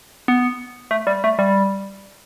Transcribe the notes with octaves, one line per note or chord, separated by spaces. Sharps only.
B3
A3
G3
A3
G3